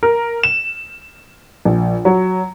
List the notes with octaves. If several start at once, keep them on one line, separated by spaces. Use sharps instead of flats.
A#4
E7
A#1
F#3